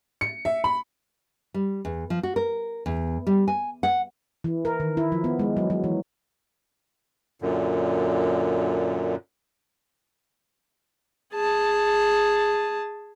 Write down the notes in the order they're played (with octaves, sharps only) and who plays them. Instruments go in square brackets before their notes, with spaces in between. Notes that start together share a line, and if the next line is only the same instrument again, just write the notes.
[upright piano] C#7
E5
B5
[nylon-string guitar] G3
E2
F3
F#4
A#4
E2
G3
G#5
F#5
[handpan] E3
A#4
D#3
E4
F3
B3
G#3
F#3
F#3
E3
[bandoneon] F#2 A#2 D3
[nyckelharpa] G#4 A5